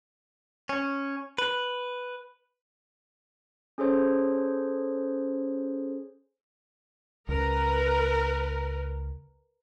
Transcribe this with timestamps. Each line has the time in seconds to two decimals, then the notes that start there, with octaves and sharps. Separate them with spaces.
0.69 C#4
1.38 B4
3.78 C#4 G#4 A4 C5 C#5
7.29 C#2 A#4 B4